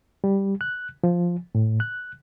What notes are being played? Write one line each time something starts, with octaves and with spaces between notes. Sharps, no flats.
G3
F#6
F3
A2
F#6